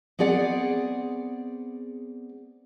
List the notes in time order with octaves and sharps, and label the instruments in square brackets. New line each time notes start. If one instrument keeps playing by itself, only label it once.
[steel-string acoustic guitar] B3 C4 G#4 D5 F#5